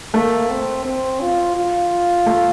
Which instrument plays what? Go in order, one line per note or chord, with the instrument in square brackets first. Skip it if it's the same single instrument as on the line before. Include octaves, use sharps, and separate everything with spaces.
[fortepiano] A3 [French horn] A#3
[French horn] C4
C4
F4
F4
[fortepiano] A3